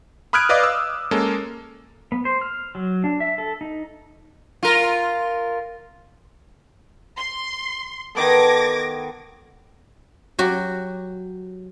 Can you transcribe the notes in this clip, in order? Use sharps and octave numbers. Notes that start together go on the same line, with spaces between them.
B5 D#6 F6 F#6 G#6 D7
B4 D5 D#5 F5 D6 D#6
E6
G#3 A#3 C#4 A4
B3
C5
F6
F#3
D4
E5
A4
D#4
F4 A#4
C6
D#3 B3 A4 D6 G#6 A#6
F#3 F#4 G4